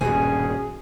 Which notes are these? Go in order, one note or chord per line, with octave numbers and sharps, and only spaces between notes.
D#1 G2 B2 C#4 F#4 G#4 G#5